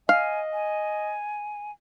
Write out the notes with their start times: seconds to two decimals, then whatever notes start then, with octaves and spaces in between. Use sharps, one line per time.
0.09 D#5 F5 G#5
0.53 G#5